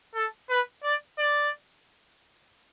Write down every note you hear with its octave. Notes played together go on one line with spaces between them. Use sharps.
A4
B4
D5
D5